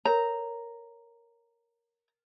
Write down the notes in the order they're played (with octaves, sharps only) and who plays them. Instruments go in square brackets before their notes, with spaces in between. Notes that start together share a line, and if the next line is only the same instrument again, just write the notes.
[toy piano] A4 A#4 C#5 [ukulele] A#5